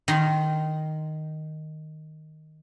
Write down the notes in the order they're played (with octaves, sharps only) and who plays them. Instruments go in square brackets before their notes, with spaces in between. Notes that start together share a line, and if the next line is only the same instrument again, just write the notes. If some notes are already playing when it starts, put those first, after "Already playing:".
[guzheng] D#3 C6